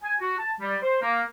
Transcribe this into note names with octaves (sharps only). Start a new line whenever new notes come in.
G#5
F#4
A5
G3
C5
A#3